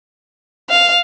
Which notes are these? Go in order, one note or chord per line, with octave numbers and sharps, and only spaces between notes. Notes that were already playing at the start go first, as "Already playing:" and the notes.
F5